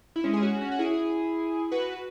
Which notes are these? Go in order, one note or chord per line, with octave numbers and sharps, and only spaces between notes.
E4
G#3 C#4
G#4
C#4 F#4
C#4 F#4
F#4
E4 G#4
F#4 B4